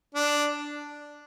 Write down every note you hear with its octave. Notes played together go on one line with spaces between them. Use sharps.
D4